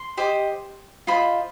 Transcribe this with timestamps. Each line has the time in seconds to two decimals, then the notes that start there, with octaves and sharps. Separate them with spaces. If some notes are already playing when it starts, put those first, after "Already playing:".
Already playing: C6
0.17 G4 C5 D#5
1.07 F4 C5 D#5 B5